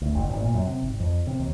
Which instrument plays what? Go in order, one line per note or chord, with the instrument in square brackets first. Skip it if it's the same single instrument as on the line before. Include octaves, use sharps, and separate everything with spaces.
[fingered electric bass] D2
F#1
G#1
A#2
F#2
C3
G#1
F2
C3
D#2